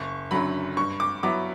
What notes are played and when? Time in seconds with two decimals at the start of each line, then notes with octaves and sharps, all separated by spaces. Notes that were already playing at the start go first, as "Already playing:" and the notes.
Already playing: F#1 C#6
0.31 F#2 D3 F#3 B5
0.77 G2 C#6
1.00 D6
1.23 F#3 B3 E4 D6